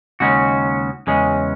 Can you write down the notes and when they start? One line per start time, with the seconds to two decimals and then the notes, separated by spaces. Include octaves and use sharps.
0.20 D#2 C#3 G#3 C#4 F#4
1.07 E2 C#3 G#3 C#4